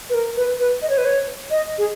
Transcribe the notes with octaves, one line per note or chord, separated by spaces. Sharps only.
B4
A#4
B4
B4
D#5
C#5
B4
C#5
D#5
G#4